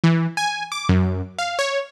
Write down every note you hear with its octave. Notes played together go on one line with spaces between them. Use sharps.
E3
G#5
D6
F#2
F5
C#5